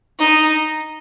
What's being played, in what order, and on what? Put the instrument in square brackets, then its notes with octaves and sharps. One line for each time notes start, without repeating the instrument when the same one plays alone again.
[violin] D#4